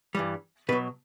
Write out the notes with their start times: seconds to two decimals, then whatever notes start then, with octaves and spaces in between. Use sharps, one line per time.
0.15 G2 E3 G3
0.69 B2 B4
0.72 F#3